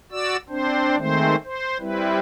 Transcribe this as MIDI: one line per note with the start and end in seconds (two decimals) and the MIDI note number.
0.12 0.37 66
0.12 0.37 74
0.12 0.37 88
0.49 0.97 60
0.49 0.97 62
0.49 0.97 72
0.97 1.35 51
0.97 1.35 56
0.97 1.35 57
0.97 1.35 60
0.97 1.35 72
1.44 1.77 72
1.80 2.19 55
1.80 2.19 60
1.80 2.19 64
1.80 2.19 71